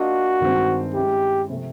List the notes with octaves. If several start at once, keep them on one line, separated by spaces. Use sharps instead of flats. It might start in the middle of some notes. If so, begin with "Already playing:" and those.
Already playing: A#3 D4 F4 F#4 A#4 D#5
G2 D#3 G#3 C4
G#3 C#4 E4 G4
C3 F3 A3